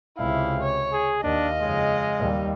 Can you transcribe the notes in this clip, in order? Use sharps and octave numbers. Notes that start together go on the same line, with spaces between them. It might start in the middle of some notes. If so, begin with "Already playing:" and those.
C#2 C3 E4 F5
C#5
G#4
D#2 D4 D#5 F5
F2 C#3 G#3
D#2 G3